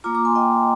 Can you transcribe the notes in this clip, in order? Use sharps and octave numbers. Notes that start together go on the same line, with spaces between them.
A#3 F4 A#5 D6
A#5 D6
G#5 C6
D#5 G5